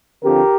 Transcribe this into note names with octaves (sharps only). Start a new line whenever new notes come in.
D3 F3 C4 G4 A#4